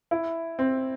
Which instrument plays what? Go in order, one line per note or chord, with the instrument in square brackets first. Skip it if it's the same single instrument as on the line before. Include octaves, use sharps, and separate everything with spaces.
[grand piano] E4
C4